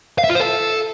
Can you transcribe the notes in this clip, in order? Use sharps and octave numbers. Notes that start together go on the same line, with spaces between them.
F5
E5
F4
C5
A4